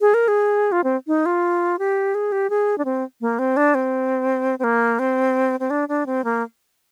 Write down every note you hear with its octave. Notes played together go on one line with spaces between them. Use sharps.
G#4
A#4
G#4
F4
C4
D#4
F4
G4
G#4
G4
G#4
D4
C4
A#3
C4
D4
C4
C4
A#3
C4
C4
D4
D4
C4
A#3